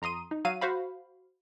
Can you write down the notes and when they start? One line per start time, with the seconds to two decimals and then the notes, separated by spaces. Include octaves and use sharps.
0.02 F2 A#5 C6 D#6 D#7
0.31 D#4
0.45 F#3 F5 D#7
0.61 F#4 C5 F5 B5